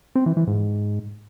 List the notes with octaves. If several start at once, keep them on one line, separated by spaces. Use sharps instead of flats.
C4
E3
E3
G#2